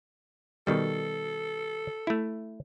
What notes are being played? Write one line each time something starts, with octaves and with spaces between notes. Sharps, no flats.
B2 D#3 G3 A4
A3 E4